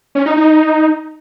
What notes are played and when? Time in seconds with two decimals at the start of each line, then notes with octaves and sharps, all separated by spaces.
0.15 C#4
0.26 D#4
0.36 D#4